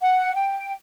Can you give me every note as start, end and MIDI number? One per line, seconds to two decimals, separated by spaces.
0.01 0.32 78
0.35 0.73 79